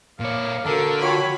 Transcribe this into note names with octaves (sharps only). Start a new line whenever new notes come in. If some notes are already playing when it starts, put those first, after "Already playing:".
A#2 A#3 C#5 D5 F5
D3 A#3 F#4 A4 A#4 G#5 A5
F4 F#4 C#5 G5 B5